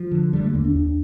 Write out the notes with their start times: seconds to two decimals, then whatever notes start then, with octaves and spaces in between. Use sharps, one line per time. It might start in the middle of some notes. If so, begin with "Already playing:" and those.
Already playing: F3
0.11 D3
0.33 D3 G3
0.44 A3
0.54 D#2 A#3
0.65 D4
0.75 D#2 D4